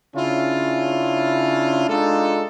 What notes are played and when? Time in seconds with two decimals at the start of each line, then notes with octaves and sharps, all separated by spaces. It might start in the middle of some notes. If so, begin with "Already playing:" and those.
0.15 C#3 C#4 D4 E4 F4
1.89 G#3 D4 D#4 F4 A4